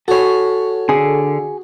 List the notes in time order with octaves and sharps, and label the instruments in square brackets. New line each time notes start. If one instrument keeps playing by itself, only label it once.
[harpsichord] F#4 G#5 [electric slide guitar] A4 C#5
[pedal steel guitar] D3 [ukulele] G#4